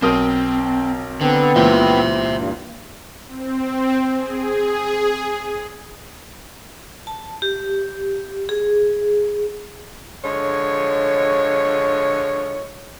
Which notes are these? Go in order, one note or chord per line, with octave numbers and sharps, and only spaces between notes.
B1 C4 A#4 D#6
D3 B3 C4
C#2 A#2 E3 C5 E5
G2
C4
G#4
A5
G4
G#4
D3 F3 G#3 C#5